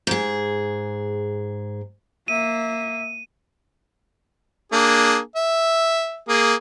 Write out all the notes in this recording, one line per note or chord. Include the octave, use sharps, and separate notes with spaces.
G#2 G#4
A#3 E5 D#7
A#3 D4 G#4
E5
A#3 G#4